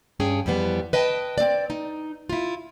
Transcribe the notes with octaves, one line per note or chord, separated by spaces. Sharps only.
G2 C#4 G#4 G5
F2 E3 G3 B3
B4 D#5 G5 A5
C4 D5
D#4
E4 F4